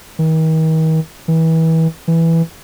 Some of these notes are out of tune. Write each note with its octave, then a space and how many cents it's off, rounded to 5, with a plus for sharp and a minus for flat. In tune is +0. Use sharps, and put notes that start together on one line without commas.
D#3 +40
E3 -30
E3 +0